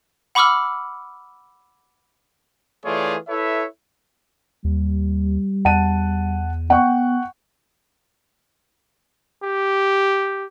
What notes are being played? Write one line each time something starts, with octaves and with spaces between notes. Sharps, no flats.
F#5 B5 C#6 D6 E6 F6
E3 A3 F4 G#4 C#5 D5
E4 A4 B4 C#5 E5
D#2 G3
E2 F#5 A5 D#7
B3 F#5 G5 C#6
G4